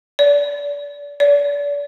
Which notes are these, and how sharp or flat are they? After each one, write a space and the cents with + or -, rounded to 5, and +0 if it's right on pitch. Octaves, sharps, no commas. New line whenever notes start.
D5 -30
D5 -35